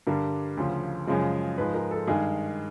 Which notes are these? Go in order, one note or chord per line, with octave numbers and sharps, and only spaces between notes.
G2 D3 G3 A#4
D2 C#3 F3
F#2 C#3 F3 G#3
G#2 F3 G#3 B4
A#4
A4
G2 D#3 G#3 G#4